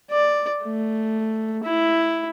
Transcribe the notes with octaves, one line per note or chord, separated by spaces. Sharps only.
D5
A3
E4